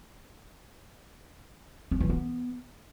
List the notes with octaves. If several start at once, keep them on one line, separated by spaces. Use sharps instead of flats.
C4
E3
B3